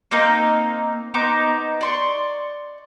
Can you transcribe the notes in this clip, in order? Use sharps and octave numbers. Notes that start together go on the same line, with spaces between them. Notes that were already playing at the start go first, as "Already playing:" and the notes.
A#3 C4 D#4
B3 D#4 C5 D6
D5 C6 C#6